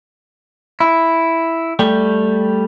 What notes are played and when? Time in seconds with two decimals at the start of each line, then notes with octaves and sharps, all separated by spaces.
0.80 E4
1.79 G3 A3 G4